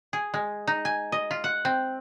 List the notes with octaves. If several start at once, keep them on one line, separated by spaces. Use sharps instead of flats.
G#4
G#3
D#4
G#5
D#5
F4
F#5
C4